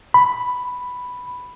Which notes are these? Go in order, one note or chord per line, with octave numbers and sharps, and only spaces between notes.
B5